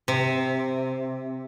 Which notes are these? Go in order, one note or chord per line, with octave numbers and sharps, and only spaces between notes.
C3